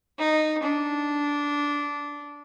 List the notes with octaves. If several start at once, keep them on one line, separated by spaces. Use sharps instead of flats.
D#4
D4